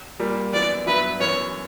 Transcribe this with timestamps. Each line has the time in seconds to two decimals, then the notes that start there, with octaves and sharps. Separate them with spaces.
0.20 A#2 G3 A#3
0.53 F#2 E3 B3 D5
0.86 G2 F#3 B3 E4 B4
1.20 F#2 E3 B3 C#5